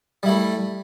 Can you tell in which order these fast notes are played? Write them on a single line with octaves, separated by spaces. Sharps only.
G3 E4 A3